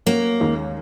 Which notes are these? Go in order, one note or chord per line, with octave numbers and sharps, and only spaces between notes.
F#3 A#3 C#4 F#4
D#2 D#3 G#3 C#4